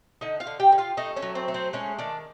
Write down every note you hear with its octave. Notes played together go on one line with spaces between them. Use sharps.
D3 D#4 D#5
F4 F5
D3
G4 G5
D3
F4 F5
A3 D#4 D#5
C#4 C#5
F#3
C4 C5
A3
C4 C5
G#3 C#4 C#5
D#3 D4 D5